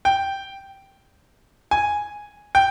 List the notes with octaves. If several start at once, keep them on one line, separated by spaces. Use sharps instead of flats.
G5
G#5
G5